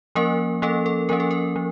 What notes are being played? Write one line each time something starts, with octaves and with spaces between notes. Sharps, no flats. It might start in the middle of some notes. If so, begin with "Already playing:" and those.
F3 A#3 C#4 A#4
F3 A#3 C#4 A4
A4
F3 A#3 C#4 A#4
A4
A#4
F3